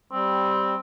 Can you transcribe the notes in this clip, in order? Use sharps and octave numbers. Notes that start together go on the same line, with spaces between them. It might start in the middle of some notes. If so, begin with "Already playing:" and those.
G3 C4